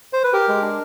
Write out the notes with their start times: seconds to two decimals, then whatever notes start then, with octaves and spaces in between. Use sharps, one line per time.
0.13 C5
0.24 B4
0.33 G4 A#4
0.48 G#3
0.62 D4